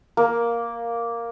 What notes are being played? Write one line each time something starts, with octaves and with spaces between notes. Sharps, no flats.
A#3